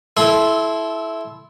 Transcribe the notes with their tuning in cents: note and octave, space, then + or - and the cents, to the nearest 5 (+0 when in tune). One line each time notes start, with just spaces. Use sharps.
E4 +0 A4 -25 C6 +0